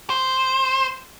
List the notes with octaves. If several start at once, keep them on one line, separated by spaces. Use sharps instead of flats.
C5